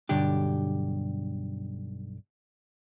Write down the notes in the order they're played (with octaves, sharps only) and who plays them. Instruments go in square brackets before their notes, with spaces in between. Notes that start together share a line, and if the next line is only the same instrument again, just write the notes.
[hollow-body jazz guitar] B1 G2 D3 F#3 D4 G4